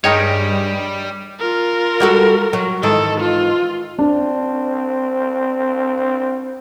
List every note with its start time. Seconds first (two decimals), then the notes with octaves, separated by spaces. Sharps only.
0.04 G2 D#3 G3 G#3 D#4 G4 C#5 G5
1.40 F4 A#4
2.00 G3 F#4 A4
2.53 F#3
2.83 G#2 D#3 E3 A4
3.20 F4
3.99 C4 D4